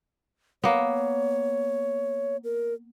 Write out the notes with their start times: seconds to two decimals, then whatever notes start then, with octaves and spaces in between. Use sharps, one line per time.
0.64 A#3 B3 C#5
2.44 A#4